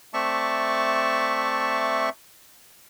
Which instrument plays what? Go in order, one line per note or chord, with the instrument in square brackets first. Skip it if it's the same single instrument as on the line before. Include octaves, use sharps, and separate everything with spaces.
[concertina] A3 C4 D5 E5 A5 C#6